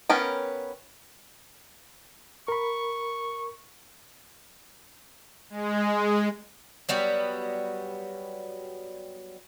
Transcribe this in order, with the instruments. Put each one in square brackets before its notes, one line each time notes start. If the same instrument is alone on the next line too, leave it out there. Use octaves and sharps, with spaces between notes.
[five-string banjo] B3 C#4 A#4 G5
[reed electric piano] A#4 B5 [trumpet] C#6
[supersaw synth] G#3
[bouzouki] F#3 G3 B3 F#4